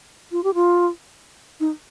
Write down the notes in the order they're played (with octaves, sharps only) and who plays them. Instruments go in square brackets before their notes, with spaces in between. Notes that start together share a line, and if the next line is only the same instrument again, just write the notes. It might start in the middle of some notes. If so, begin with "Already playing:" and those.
[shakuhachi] F4
G4
F4
D#4